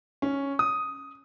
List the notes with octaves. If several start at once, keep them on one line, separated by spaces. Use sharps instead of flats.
C#4
D#6